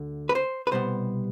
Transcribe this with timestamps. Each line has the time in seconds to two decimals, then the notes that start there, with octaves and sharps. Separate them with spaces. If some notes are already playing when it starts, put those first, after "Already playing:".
Already playing: D2 D3
0.29 B4
0.35 C5
0.67 B4
0.71 C2 B2 G3 B3 C5